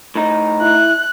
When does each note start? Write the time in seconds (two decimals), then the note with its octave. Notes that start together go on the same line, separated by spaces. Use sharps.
0.15 A2 D#4
0.61 E4 F#6